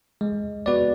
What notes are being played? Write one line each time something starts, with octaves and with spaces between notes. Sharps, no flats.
G#3
B3 F#4 B4 D5